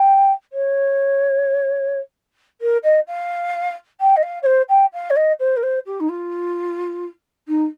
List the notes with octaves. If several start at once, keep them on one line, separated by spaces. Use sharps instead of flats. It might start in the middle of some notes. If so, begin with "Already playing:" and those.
Already playing: G5
C#5
A#4
D#5
F5
G5
D#5
F5
C#5
C5
G5
F5
C#5
D#5
C5
A#4
C5
G4
D#4
F4
D#4